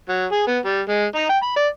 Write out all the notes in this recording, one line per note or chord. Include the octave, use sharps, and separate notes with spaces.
F#3
G#4
B3
G3
G#3
D#4
G5
B5
D5